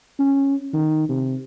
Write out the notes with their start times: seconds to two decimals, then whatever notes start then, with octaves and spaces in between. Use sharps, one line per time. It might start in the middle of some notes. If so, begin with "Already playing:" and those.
0.19 C#4
0.73 D#3
1.09 C3